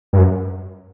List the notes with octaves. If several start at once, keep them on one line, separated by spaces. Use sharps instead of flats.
G2
F#2